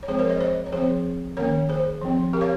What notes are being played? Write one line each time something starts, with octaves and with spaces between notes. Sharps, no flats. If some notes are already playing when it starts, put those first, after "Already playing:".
C#5
F3 G#3 C4 G#4 C5
A#4 C#5
C5 D#5
C5 D#5
C#5
F3 C4 G#4 C5
D#3 A#3 C#4 A#4 C#5
G#4 C5
F3 C4
G4 A#4
C#5 F5